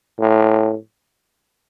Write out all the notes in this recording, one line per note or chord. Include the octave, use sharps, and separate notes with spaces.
A2